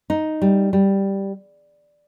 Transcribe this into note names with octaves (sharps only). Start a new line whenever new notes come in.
D#4
G3
G3